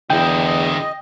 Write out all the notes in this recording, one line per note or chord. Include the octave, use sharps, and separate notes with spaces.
E2 D3 E4 D#5 G5